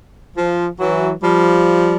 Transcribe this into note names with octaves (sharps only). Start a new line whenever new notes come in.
F3
E3 F#3
F3 G3